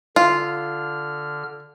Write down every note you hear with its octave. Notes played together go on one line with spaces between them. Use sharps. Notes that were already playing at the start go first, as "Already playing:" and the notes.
D3 F4 F6